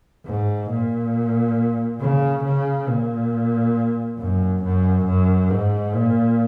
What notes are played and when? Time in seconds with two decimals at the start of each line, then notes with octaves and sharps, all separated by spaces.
0.26 G#2
0.70 A#2
2.00 C#3
2.45 C#3
2.88 A#2
4.19 F#2
4.64 F#2
5.07 F#2
5.51 G#2
5.95 A#2